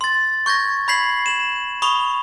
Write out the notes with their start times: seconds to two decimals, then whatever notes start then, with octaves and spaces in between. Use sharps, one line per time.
0.01 C6 A6
0.46 C#6 G6 G#6 A#6
0.88 B5 G6 G#6 B6 C7 F#7
1.26 E7 F#7
1.82 B5 C#6 D#6 F7 G7